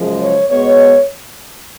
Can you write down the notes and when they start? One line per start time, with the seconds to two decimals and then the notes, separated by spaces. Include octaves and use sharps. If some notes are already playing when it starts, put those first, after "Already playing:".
Already playing: F#2 C#3 F3 G#3
0.20 C#5
0.49 B2 G#3 B3 C#5